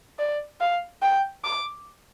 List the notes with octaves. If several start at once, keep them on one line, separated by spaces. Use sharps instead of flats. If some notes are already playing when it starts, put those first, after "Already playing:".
D5
F5
G5
D6